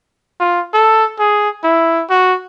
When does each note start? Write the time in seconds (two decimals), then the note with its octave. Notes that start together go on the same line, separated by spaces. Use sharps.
0.40 F4
0.74 A4
1.20 G#4
1.64 E4
2.10 F#4